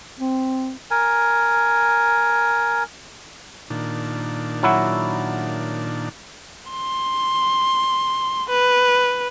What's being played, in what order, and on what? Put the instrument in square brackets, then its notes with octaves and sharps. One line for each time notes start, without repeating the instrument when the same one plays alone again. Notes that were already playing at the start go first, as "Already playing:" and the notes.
[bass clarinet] C4
[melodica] A#4 G#5
[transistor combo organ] A#2 D#3 D4
[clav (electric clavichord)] F#3 E4 F#4
[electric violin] C6
B4